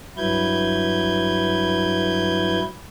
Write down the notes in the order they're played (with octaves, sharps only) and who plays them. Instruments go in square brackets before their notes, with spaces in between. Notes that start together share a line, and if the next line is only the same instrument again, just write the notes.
[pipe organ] G2 F#3 E4 B4 G6 G#6